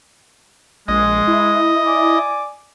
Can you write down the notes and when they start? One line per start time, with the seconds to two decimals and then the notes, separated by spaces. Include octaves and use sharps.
0.88 A#1 G#3 D#5
1.28 E4
1.87 D5 G#5 D6